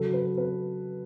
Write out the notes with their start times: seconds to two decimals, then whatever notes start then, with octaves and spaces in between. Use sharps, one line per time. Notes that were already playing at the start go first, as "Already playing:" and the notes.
Already playing: C#3 F#3 A4
0.13 B4
0.37 B4